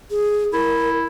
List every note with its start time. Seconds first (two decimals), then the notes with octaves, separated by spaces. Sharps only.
0.11 G#4
0.53 E4 A#4